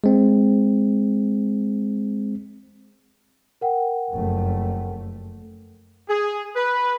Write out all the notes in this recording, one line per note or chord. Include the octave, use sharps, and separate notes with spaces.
G#3 C4
A#4 F#5 G5
F#1 F2 A3
G#4
B4